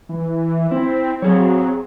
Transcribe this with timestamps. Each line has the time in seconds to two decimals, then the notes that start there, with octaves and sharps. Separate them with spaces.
0.09 E3
0.71 C4 E4
1.22 F#3 C4 G#4 C#5